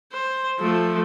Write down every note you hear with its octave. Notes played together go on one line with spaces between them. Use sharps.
C5
F3 A3